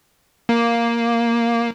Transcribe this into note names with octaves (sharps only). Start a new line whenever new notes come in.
A#3